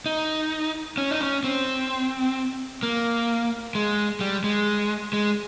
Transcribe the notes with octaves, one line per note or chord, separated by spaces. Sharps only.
D#4
C#4
D#4
C#4
C4
A#3
G#3
G3
G#3
G#3